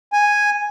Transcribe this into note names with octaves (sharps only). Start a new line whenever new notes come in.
G#5